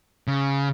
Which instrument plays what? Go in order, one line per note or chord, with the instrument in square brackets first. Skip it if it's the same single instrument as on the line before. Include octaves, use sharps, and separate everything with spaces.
[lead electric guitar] C#3